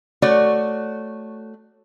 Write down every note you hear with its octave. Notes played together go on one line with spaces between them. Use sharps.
A3 F#4 C#5 D5